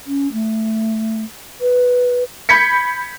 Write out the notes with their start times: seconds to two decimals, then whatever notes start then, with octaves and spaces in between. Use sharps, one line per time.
0.06 C#4
0.32 A3
1.61 B4
2.49 B5 G6 G#6 B6 C#7